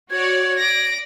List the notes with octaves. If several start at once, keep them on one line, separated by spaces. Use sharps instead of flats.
F#4 C#5 D5 G#6
D5 A#6 D7